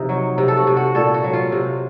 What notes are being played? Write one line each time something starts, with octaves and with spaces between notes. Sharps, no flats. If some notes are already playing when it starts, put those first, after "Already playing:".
Already playing: C3 F3 D#4
F#3
C3
A4
F#4
C3
F#4
A#2 A4
F#4
F#3
F4
C3